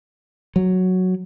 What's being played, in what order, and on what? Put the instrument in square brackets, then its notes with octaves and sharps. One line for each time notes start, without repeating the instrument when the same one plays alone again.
[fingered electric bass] F#3